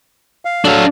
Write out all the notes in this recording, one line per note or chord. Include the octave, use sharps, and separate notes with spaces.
F5
F#3 D4 A4 F5